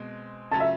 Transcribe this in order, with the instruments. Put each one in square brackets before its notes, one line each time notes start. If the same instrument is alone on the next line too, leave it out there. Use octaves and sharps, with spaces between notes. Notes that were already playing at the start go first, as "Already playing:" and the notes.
Already playing: [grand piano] B2 G#3 C4
[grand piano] C#3 F#3 A3 C#4 F4 [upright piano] A5
[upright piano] E5